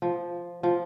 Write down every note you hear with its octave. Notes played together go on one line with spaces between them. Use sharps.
F3
F3